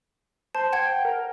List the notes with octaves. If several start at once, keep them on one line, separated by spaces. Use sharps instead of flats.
C5 A5
F#5 G5 G#6
A#4